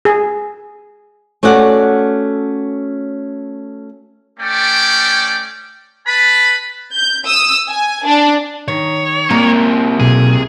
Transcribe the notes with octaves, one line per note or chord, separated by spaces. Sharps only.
G#4
A3 C#4 F#4 D5 F#5
A3 C#4 D5 G5
B4 A5 B5
G6
D#6 E6
G#5
D4
D#3 C#5
C3 A#3 A#4
B1 G#4